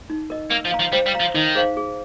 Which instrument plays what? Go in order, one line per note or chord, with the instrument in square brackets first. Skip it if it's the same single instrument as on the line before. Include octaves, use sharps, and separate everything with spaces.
[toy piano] D#4
A#4 D#5
[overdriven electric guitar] A#3 [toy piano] A#4
[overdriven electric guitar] F3
[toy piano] F5 A#5
[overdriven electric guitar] F3
[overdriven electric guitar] G3 [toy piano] C5
[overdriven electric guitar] G3
[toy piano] F5 A#5
[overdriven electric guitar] F3
[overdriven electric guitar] D#3 [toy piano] D#4
[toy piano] G#4 C5 F5
G#4